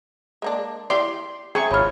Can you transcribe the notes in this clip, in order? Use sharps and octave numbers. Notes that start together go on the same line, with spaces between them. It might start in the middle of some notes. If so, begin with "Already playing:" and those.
G#3 A#3 D4
E4 G4 D5 C6
C4 G#4 E5 A#5 C#6 G#6
G#1 E4 F4 C#5 B5 F6